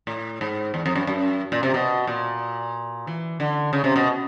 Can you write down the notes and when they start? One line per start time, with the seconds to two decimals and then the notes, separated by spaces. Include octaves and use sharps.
0.07 A2
0.41 G#2
0.74 E2
0.86 F2
0.95 F#2
1.07 F#2
1.52 A#2
1.63 C3
1.74 B2
2.07 A#2
3.07 E3
3.40 D3
3.73 C#3
3.84 C3
3.96 B2